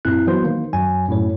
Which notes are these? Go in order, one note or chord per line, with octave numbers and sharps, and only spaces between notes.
F#2 A#2 C4 E4 F#6
E3 F#3 B3 F#4 B4 C5
D#3 A#3
F#2 F#3 G#5
F#2 A2 C#5